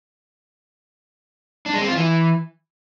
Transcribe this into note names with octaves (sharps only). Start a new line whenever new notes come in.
D4
G#3
C4
F4
E3